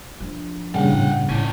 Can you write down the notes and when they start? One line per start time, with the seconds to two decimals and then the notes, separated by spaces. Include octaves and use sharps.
0.20 F3 D4
0.75 G2 A#2 C#3 F5 F#5
0.92 A2
1.29 A2 D#3 C#4 D#4